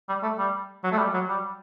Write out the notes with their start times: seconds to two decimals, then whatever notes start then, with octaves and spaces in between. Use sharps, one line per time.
0.08 G3
0.23 A3
0.38 G3
0.84 F#3
0.92 A3
0.98 G3
1.14 F#3
1.29 G3